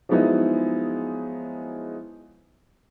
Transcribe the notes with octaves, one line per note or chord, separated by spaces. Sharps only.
F3 F#3 G#3 B3 D#4 E4